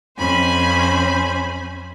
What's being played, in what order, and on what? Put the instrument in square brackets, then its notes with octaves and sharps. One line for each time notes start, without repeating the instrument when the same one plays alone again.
[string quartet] F2 C#4 C5 G#5 B5